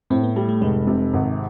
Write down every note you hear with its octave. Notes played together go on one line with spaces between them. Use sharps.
A2 C4
B3
G3 A3
A3
F1 G#3
C3
G#1